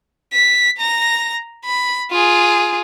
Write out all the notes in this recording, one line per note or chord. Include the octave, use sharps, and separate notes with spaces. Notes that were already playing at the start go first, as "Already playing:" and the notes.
B6
A#5 A#6
B5
F4 G#4